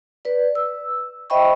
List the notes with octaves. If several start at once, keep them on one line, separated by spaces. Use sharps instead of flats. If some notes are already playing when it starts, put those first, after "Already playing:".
B4 D5
E6
C5 D#5 E5 G5 B5 C#6